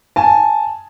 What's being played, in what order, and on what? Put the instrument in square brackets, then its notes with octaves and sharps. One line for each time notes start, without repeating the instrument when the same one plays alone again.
[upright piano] G#5 A5